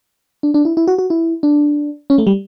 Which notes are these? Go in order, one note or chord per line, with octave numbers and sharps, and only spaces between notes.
D4
D4
E4
E4
F#4
F#4
E4
D4
C#4
A3
G3